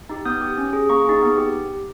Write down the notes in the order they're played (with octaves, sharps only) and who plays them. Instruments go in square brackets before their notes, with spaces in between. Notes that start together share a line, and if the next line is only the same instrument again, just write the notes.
[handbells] D#4 G4
B3 D#6 G6
G4
C#4
G#4
A#3 A#5 C#6
D#4 G#4
B3
G4